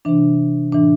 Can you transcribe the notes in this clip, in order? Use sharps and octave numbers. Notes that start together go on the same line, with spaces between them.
C3 E3 D4
A2 E3 D4